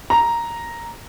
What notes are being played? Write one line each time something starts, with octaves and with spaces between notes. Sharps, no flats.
A#5